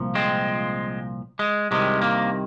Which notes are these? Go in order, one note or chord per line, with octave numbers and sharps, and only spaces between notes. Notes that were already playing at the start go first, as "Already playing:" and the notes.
Already playing: C2 A#2 F3
G#3 C4
G#3
C2 C3 D#3 G#3
A#3